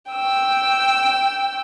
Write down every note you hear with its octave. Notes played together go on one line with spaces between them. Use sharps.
G5 E6